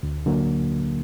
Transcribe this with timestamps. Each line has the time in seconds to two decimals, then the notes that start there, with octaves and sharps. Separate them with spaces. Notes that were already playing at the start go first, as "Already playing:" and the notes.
0.03 D2
0.26 D3 F#3 A#3